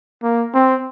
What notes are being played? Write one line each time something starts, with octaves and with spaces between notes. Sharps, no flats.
A#3
C4